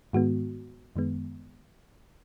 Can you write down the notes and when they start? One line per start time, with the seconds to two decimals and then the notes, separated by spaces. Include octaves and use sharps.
0.13 G#2 D#3 G#3 B3 F#4
0.96 F#2 D#3 G#3 B3